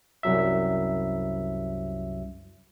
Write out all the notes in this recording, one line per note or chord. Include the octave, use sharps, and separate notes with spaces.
C2 F#2 F#3 E5